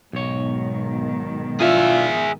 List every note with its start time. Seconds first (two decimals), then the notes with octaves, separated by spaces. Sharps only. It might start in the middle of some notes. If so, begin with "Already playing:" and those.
0.13 B1 G#2 B2 D#3 C#5
1.61 D4 E4 F4 G#4 E5